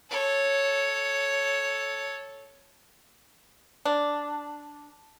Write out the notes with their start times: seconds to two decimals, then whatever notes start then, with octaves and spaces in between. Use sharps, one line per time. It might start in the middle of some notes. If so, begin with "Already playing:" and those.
0.10 A4 C#5
3.85 D4